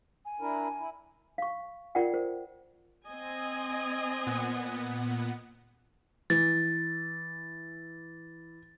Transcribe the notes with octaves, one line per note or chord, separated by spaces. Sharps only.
G#5
D4 E4 A#4
E4
F5 C#6
F4 A#4 D5 F#5 G5
A#4 C5
C4 D#5 G#5
A#2 B3 F#5
E3 A6